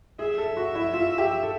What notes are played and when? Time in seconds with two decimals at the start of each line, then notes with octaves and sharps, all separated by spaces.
0.19 G#4 E5
0.38 A4
0.57 F#4
0.75 E4
0.94 F4
1.18 G4
1.43 A4